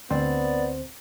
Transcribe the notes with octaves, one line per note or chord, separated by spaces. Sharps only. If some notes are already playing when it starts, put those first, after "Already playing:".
D2 B3 C4 C5 D5